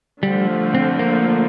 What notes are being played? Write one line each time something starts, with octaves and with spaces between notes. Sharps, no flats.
D3 F3 G3 A3
C4
A#3